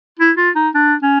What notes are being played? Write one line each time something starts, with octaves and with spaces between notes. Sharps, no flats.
E4
F4
D#4
D4
C#4